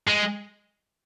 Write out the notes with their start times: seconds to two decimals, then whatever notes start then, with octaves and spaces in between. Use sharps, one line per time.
0.08 G#3